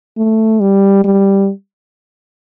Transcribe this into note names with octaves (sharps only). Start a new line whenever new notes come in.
A3
G3
G3